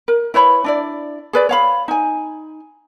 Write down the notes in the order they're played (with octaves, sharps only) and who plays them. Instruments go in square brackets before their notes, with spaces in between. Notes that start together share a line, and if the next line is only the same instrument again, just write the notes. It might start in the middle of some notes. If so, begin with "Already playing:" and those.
[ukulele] A#4
E4 B4 C#5 B5
D4 E4 D5
G#4 B4 D5
C#5 F5 B5
D#4 G#5